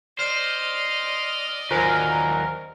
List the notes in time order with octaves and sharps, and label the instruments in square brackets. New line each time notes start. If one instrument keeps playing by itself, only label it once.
[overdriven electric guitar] C5 [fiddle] D5 D#5 [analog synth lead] F6
[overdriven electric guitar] D#2 F#3 [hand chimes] F4 C5 G#5 [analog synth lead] A#4